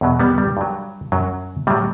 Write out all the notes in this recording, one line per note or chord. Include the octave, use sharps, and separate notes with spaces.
E2 B2 F#3
G3 B3
G3
G2 F#3
F#2 F#3
A2 F#3 G3